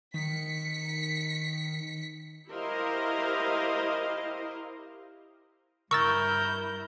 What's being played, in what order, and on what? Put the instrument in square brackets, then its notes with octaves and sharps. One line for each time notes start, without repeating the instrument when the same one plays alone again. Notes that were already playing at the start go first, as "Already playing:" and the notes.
[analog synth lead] D#3 [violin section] B6 C#7
[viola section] E4 G4 A#4 C5 D#5 F5
[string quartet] G2 E4 G6 [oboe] A#4 [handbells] C#6 E6 A6